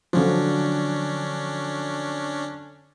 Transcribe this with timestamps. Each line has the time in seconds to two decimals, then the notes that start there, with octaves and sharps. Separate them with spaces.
0.13 D3 F3 F#3 C#4 D4